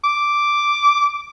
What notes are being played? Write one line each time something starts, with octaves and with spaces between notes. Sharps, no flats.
D6